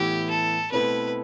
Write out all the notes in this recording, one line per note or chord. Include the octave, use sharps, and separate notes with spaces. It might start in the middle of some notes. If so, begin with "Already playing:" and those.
Already playing: A2 E3 B3 E4 G4 B4
A4
B2 A3 C4 E4 A4 B4